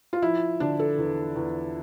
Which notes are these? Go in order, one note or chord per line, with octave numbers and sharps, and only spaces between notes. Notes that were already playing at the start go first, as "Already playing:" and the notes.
F4
F3 E4
D3 D4
A4
E2
E2